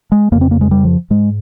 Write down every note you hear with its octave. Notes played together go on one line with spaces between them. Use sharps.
G#3
F2 C#3 A#3
C4
A#3
G#3
G3
F3
G#2 G#3